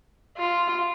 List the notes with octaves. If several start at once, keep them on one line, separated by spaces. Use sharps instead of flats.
F4